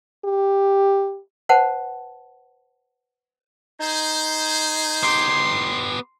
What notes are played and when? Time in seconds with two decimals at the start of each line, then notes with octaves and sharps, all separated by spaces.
0.25 G4
1.49 B4 C5 F#5 A5
3.80 D#4 G#4 C5
5.03 B3 G4 C6